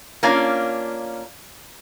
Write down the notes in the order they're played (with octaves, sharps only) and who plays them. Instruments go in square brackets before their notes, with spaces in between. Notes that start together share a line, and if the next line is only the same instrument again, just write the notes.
[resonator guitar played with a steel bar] A#3 C#4 D4 F4